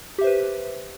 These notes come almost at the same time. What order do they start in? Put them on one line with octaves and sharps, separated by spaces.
G4 E5 C5 B4